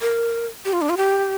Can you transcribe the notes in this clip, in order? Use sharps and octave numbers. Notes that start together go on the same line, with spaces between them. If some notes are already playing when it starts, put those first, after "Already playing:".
A#4
G4
F4
D4
F4
G4